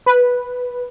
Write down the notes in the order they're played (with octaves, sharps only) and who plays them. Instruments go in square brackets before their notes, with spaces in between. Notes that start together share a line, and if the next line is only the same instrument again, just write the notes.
[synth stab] B4